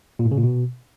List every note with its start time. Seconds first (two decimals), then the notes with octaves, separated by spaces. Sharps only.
0.19 A#2
0.25 A2
0.31 C#3
0.37 A#2
0.43 B2